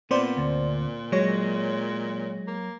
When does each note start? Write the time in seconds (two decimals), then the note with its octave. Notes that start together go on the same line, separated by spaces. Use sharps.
0.11 A#2 B3 C4 C5 D5
0.37 D2
1.12 F#3 G#3 C#5 A#6
2.47 A#3